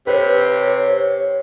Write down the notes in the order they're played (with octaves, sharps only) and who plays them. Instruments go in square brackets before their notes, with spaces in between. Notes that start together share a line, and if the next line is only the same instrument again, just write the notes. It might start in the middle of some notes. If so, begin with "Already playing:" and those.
[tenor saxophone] C3 [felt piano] B4 [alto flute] C#5